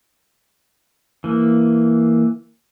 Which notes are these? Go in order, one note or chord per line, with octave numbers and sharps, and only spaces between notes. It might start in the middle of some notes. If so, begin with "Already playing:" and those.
E3 A#3